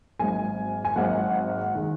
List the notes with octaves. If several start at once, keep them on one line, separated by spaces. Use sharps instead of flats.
G#1 G#2 F#3 A#3 G#5
G#5
G#1 G#2 F#3 A#3 F#5
D#3 G#3